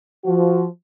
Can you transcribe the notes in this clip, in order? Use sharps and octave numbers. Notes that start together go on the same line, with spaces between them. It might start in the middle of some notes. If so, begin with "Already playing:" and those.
F3 F#4